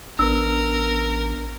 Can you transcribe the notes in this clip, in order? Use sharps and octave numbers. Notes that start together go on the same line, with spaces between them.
A1 B3 D4 A#4 E6